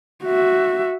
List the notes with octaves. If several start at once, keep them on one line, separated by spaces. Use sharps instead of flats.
F#4 E5